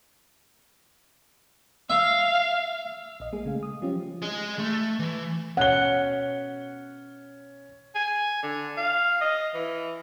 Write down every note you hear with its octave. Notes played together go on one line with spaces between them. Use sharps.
E5 F5
A#1 D#5
G#3 A#3 G#4
C#3 A3 F5
D#6
F3 F#3 C#4 F4 G4
G#4 D#5
A3
E3
B2 C#4 F#5 G7
G#5
D3
F5
D#5
E3